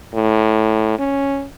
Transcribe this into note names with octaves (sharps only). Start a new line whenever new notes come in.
A2
C#4